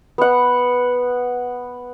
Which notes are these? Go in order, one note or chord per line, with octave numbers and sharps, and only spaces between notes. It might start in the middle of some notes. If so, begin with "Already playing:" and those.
B3 F#5